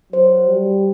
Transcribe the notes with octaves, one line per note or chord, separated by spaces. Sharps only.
F#3 C5
G3